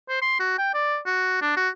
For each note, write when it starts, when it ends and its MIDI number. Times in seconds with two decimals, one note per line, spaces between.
0.09 0.20 72
0.22 0.38 84
0.40 0.54 66
0.59 0.70 79
0.74 0.98 74
1.06 1.42 66
1.42 1.53 62
1.57 1.69 66